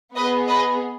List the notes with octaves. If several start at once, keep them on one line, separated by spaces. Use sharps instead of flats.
B3 G#4 B4 D#5
B4 D#5